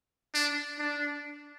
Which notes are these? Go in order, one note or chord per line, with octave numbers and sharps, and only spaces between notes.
D4
D4